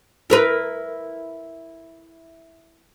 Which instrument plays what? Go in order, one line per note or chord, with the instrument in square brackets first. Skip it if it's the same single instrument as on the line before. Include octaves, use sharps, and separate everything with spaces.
[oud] E4 A#4 B4